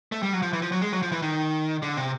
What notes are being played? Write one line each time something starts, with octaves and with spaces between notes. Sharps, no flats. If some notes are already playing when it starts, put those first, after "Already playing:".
A3
G3
F#3
F3
E3
F3
F#3
G#3
F#3
F3
E3
D#3
D3
C3